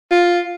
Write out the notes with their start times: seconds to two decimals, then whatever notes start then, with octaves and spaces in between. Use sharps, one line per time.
0.11 F4